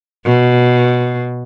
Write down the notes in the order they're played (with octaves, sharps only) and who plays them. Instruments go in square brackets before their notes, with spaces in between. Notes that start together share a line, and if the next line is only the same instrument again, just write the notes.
[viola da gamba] B2